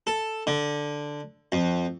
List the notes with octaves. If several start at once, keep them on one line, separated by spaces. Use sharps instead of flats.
A4
D3
F2